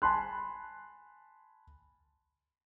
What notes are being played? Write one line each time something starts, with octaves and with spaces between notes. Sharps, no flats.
G#5 A5 B5 C6 F#6